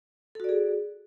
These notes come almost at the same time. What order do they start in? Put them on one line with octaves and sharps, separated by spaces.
A4 F#4 D5 G#4